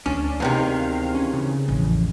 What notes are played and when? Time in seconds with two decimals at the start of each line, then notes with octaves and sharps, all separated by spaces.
0.06 D2 C#4 D4
0.40 E2 C3 D#3 F5
1.15 C#4
1.33 C#3
1.68 A1 F2